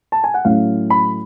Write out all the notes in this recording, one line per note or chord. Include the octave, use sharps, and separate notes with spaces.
A5
G#5
F#5
A2 F#3 A3 C#4 F5
B5